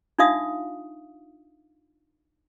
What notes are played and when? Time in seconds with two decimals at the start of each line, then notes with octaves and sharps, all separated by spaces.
0.19 D4 D#4 F4 E5 F5 D#6